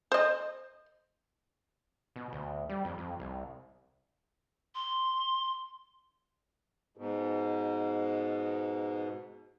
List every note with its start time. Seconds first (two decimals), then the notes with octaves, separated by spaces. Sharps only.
0.12 C5 D#5
2.16 B2
2.33 D2
2.69 G3
2.85 F2
2.98 F2
3.20 C2
4.75 C6
6.97 G#2 B2